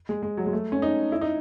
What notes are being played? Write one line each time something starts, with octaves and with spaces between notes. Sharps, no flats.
G#3
G#3
F#3
G#3
A3
C#4
D#4
E4
D#4